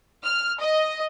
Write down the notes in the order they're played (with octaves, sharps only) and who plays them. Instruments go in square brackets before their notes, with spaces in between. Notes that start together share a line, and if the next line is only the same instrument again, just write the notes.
[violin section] F6
D#5